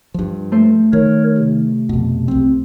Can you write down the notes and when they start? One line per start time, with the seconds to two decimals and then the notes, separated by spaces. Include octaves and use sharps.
0.14 G2 F3
0.52 A3 C5
0.93 D#3 A#4 C#5
1.38 C3
1.89 F2 B2
2.28 C2 C4